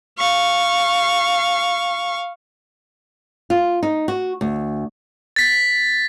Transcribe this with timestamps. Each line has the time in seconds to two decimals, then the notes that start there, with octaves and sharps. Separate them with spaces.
0.18 F5 C#6
3.50 F4
3.83 D#4
4.08 F#4
4.41 D2
5.36 A6 B6